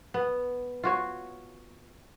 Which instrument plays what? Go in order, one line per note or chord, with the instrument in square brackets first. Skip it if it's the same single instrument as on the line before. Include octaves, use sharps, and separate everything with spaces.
[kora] B3
F4 F#4 C#5